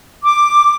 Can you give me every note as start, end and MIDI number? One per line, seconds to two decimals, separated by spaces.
0.24 0.75 86